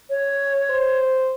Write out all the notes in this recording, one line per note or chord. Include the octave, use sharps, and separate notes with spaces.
C#5
C5